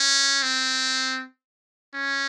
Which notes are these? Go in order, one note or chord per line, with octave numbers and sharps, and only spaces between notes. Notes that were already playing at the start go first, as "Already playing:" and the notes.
Already playing: C#4
C4
C#4